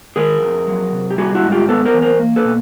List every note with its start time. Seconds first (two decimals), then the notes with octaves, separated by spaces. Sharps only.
0.16 D#3 G#4 A#4
0.42 F2
0.67 F#3
0.92 C3
1.11 G4
1.17 G3 F#4 G#4
1.35 E4 F#4
1.43 G#2
1.52 F4 G4
1.68 B3 A4 B4
1.85 A#4 C5
1.94 E3
2.02 A#4 C5
2.19 A#3
2.36 A4 B4
2.45 B2